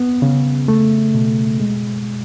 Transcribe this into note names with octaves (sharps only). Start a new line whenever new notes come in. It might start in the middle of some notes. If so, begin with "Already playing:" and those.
Already playing: B3
C#3
A3
B2
G#3